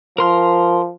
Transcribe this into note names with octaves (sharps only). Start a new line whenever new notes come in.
F3 A#4 C6 F6